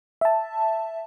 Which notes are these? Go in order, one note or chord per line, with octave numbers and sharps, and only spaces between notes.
E5 A5